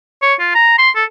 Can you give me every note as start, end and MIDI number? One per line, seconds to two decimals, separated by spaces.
0.22 0.34 73
0.40 0.53 65
0.55 0.77 82
0.79 0.90 84
0.96 1.04 69